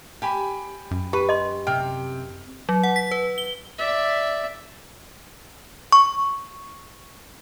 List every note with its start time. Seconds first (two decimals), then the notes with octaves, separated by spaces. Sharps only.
0.22 G4 G5 G#5 B5
0.91 F#2
1.13 G4 B4
1.29 D#5 C6
1.67 C3 G5 F6
2.69 F#3
2.83 F#5
2.96 B6
3.11 B4
3.38 G7
3.79 D5 E5
5.92 C#6